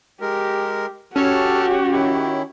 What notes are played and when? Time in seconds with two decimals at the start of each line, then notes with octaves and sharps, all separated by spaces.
0.21 G#3 G4 A#4
1.16 C#4 F#4 G4 A4 C#5 A5 F6
1.92 D#3 E4